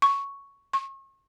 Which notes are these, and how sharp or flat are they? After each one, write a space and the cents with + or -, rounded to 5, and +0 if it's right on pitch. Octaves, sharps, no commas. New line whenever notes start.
C#6 +5
C#6 -35